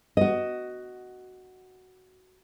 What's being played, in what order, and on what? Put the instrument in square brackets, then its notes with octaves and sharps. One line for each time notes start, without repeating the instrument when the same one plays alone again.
[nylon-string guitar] F#4 D#5